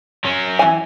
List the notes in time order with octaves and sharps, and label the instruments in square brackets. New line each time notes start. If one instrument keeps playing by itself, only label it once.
[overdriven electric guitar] F#3 C#4
[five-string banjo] E3 G#5